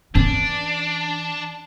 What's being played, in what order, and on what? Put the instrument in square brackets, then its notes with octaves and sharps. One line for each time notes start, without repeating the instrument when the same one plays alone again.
[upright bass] E3 C#4 [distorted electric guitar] D4